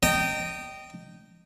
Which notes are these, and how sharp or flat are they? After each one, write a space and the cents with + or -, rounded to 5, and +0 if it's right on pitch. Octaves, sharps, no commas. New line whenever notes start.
D#5 -15 G5 -15 A#5 -45